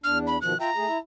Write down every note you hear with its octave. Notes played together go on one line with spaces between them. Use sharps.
E2 D4 F6
B5
B2 D#3 F3 F#6
F4 E5 G5 A#5
A3 G#4
E4 E5